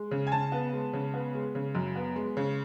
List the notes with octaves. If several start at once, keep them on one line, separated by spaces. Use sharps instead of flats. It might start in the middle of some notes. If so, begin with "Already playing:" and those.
Already playing: G#3
C#3
G#5
C#3 A5
B3
G#3
C#3
B3
G#3
C#3
F#2
B3
G#3
C#3